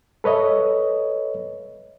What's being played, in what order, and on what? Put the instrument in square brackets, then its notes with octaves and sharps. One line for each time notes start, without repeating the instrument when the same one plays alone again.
[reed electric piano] A4 B4 C#5 D#5 E5